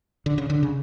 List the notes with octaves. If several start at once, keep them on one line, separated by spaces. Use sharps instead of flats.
D3
C#3
D3
C#3